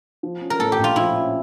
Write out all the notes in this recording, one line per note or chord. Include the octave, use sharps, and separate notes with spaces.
F3
C#4
A#4
A2 A4
G4
A#1 F4
F3 E4
C#4